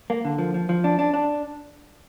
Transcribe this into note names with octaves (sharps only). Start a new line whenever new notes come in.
A#3
D3
F3
F3
F3
D4
D4
D4